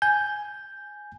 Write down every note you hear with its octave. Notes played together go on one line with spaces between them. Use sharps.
G#5 G6